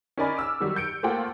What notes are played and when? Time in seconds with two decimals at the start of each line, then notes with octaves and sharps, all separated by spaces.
0.18 C#4 D#4 A#4 D5 G#5 B5
0.37 D6 E6 F6
0.60 D#3 F#3 G3
0.76 G6 C#7 D7
1.03 A3 A#3 F4 C5 F#5 G5